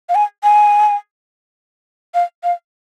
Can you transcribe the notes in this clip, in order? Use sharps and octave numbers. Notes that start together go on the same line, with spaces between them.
F5
G#5
G#5
F5
F5